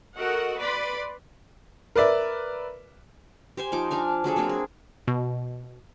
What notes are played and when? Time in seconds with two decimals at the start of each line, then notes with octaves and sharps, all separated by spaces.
0.17 F#4 A4 A#4 D#5 F#5
0.58 B4 D5 B5 C6
1.96 A#4 B4 D5 E5
3.57 G4 C5 G#5
3.72 F3 D#4 D6
3.91 D4 F5 G#5
4.24 F#3 D4 G#4 A4
4.36 F#3 A#3 C4 D4
4.49 G#4
5.08 B2